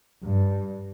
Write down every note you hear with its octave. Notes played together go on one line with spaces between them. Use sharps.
G2